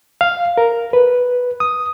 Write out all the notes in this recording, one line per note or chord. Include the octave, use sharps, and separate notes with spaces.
F5
A#4
B4
D#6